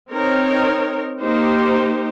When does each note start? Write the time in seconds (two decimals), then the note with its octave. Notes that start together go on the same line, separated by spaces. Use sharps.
0.11 C4 D#4 A#4 C#5
1.21 A#3 D#4 G4 C5